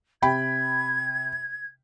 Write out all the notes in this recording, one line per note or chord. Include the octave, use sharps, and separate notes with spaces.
C3 G5 B5 G#6